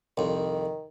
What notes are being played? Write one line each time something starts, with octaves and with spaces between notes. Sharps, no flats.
C2 F2 D#3